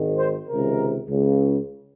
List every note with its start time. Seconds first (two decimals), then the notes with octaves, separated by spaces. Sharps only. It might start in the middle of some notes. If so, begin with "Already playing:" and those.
Already playing: G#1 G#2 D#3
0.18 C5
0.48 C#2 C3 D#3 A#4
1.09 C#2 C#3